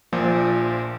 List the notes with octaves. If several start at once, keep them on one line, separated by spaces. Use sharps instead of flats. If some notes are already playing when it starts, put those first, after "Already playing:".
A#1 A#2 F3